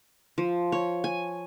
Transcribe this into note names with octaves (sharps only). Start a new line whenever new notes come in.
F3
C#5
G#5